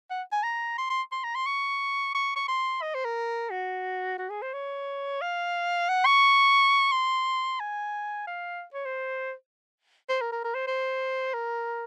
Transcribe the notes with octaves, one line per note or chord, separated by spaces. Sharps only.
F#5
G#5
A#5
C6
C6
C6
A#5
C6
C#6
C#6
C#6
C6
D#5
C5
A#4
F#4
F#4
G#4
C5
C#5
F5
F#5
C#6
C6
G#5
F5
C#5
C5
C5
A#4
A#4
A#4
C5
C5
A#4